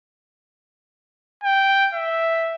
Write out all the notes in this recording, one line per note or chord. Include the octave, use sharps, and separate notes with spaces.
G5
E5